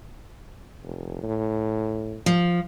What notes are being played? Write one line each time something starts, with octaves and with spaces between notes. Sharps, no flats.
F1
A2
F3